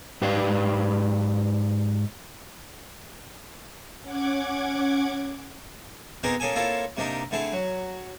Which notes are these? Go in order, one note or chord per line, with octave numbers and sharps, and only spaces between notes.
G#2 G4 B4 D5 F5
C#4 F#5 D6 G#6
B3 C4 D#4 G4 G#4 A#4
A#3 C#4 G#4 A4 G#5
A#3 C4 E4 F4 A4 C#5
C3 A#3 D4 D#4 G4
D3 A3 C4 E4 G#4
F#3